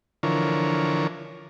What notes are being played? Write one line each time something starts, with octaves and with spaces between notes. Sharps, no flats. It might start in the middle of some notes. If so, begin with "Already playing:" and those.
D3 E3 F3 A#4 C#5